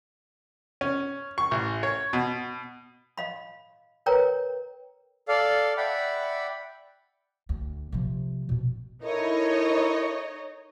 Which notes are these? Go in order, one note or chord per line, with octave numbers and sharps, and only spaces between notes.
C#4
C#6
A1
C#5
B2
D#5 F5 B5
A#4 B4 C#5 G5 A#5
A4 D5 F5
D5 E5 F#5 G5 B5
D2
C3 F3
B2 C4
D#4 E4 A4 A#4 C#5 D#5